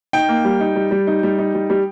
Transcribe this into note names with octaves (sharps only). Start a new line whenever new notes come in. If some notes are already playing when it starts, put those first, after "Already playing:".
D#4 G5
A#3
G3
D#4
G3
G3
D#4
G3
D#4
G3
G3